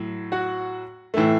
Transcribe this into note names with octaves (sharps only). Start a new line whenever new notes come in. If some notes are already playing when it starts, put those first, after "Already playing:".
Already playing: A2 F#3
F#4 F#5
A2 E3 A3